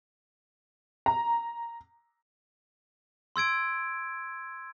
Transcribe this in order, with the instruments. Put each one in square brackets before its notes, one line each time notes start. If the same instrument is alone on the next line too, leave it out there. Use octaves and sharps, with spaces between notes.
[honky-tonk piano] A#5
[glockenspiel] C6 E6 G#6 D7